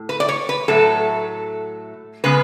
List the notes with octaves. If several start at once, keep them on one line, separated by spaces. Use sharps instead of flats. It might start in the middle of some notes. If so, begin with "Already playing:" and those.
Already playing: A2
B4
D5
C#5
B4
A2 F#3 A3 A4
C#3 G#3 B3 B4